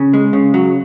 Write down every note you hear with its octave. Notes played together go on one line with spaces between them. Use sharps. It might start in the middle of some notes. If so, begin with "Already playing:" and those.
Already playing: C#3
G#3
C#3
F#3